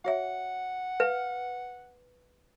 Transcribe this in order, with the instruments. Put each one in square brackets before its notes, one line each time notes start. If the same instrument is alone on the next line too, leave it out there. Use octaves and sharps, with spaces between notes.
[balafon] F#4 C#5 E5 [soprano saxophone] F#5
[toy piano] B4 [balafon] F5